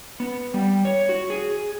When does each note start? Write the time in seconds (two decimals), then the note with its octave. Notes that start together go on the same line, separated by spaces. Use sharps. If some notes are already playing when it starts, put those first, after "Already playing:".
0.20 B3
0.54 G3
0.85 C#5
1.09 F#4
1.30 G#4